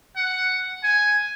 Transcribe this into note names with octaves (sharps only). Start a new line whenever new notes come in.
F#5
G#5